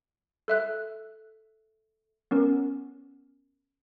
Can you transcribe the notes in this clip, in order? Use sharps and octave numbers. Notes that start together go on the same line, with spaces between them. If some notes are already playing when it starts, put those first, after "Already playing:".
A4 E5 F#6
B3 C#4 A#4